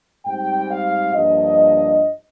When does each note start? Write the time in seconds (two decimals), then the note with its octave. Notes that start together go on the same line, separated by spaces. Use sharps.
0.24 G#2 G3 C4 G5
0.68 F5
1.13 G2 F3 A#3 D4 D#5